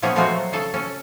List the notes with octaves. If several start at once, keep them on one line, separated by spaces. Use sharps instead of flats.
A#2 F3 B3 C#4 G#4
F3 G#3 A3 C4 F4 F#4
F#3
C#3 G#4 A4
C#4 A4